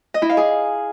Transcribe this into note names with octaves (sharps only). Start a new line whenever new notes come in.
D#5
E4
F5
G#4